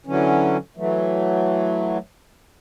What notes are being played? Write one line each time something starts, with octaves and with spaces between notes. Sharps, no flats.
D3 E3 F#3 C#4
E3 F#3 A3